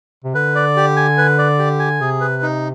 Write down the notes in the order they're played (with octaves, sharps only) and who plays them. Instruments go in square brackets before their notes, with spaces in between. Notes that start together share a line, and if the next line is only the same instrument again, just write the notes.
[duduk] C3
[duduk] D3 [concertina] B4
[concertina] D5
G4
G#5
B4
D5
G4
G#5
[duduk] C3 [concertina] G#4
[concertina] B4
D#4